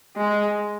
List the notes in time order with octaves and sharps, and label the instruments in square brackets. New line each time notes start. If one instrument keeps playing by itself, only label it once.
[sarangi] G#3